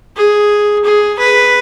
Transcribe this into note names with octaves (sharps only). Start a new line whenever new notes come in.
G#4
G#4
B4